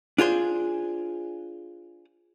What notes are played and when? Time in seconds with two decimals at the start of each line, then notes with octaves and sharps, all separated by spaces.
0.18 D4 F4 G#4 C5